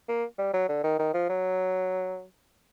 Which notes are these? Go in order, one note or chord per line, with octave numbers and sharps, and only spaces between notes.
A#3
G3
F#3
D3
D#3
D#3
F3
F#3